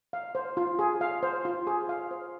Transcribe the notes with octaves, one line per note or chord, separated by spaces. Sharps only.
F5
C5
F4
G#4
F5
C5
F4
G#4
F5
C5